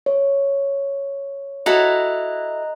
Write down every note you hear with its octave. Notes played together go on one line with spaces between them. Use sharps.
C#5
E4 F#4 A4 D#5 A#5 F#6